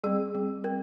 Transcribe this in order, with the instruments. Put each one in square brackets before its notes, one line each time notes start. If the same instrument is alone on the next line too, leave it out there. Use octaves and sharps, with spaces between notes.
[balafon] G3 C4 G#4
G3 C4
C4 A#4